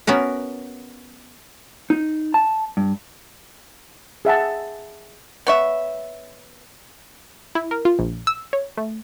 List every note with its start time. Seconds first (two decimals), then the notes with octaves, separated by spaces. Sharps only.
0.07 B3 C#4 F#4 A#4
1.90 D#4
2.34 A5
2.77 G2
4.25 G#4 E5 F#5 A5
5.47 B3 C#5 E5
7.55 E4
7.71 A#4
7.85 F4
7.99 A#1
8.27 E6
8.53 C#5
8.77 A3